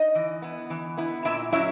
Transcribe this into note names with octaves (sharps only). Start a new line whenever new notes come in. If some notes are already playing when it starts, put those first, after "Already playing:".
Already playing: D#4 D#5
E3
B3 E4
E3
B3 E4
A#2 E4 E5
F#3 C#4 E4 E5